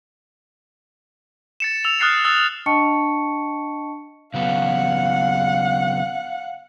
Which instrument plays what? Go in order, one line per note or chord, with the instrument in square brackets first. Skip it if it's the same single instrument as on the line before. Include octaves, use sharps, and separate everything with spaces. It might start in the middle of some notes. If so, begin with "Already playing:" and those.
[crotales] A6 C#7 E7
E6 F7
D#6 F6 F#6 A6 C7 C#7
D#6 E6 A6
[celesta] D4 D#5 G5 A5 C#6 C#7
[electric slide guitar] C#3 F#3 B3 [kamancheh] F5 F#5